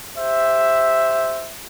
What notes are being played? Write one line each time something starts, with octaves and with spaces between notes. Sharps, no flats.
G4 C5 E5